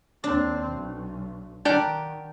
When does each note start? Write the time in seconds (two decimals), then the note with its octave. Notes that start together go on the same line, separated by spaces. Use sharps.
0.24 D#2 C4 D4
0.70 B1
1.65 D#3 D4 G4 A#4 D5 F#5